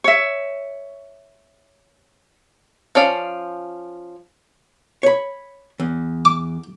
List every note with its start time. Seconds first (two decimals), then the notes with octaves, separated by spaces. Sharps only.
0.04 C#5 E5
2.95 F3 C#4 D5 F5
5.03 C#5 B5
5.80 E2
6.25 D6